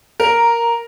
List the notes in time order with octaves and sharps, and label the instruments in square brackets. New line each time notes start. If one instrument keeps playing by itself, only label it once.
[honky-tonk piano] A#4